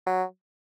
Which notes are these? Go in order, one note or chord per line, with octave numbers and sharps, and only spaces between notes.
F#3